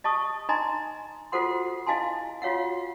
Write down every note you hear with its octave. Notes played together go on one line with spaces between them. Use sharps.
D#5 A5 C#6 D#6
D#4 D#5 G#5 A#5 C6
F4 F#4 A4 C5 F#5 C6
E4 D#5 F5 G#5 A5 C6
F4 F#4 C#5 F5 F#5